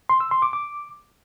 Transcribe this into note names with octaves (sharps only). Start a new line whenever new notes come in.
C6
E6
C6
D6
D6